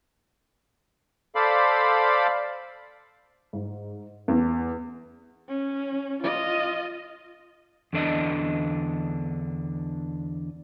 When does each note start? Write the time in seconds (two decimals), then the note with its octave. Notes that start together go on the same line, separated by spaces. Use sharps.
1.35 A4 C5 D5 F5 B5
3.53 G#2
4.28 E2
5.48 C#4
6.23 F4 D#5
7.93 E2 D3 D4 D#5